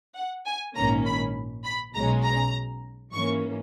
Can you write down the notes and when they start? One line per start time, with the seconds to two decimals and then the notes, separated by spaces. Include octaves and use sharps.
0.16 F#5
0.46 G#5
0.76 A#1 G#2 D#3 A#3 C#4 A#5
1.06 B5
1.64 B5
1.94 B1 B2 G#3 C#4 A#5
2.24 A#5
3.13 G#2 E3 A#3 C#4 C#6